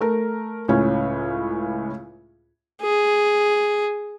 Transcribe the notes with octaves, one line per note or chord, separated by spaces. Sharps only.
A3 A#4
C#2 A2 C#4
G#4